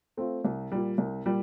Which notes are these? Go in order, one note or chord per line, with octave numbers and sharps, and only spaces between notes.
A3 C4 F4
C2
A#2 G3
C2
A#2 G3